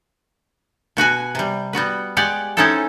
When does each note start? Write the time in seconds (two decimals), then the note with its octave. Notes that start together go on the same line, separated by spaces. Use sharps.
0.97 B2 F#4 B4 G#5
1.35 C3 G3
1.73 G3 B3 F#4 B4
2.17 G#3 G4 D5 F#5
2.57 G#3 C4 C#4 D#4 E4 A4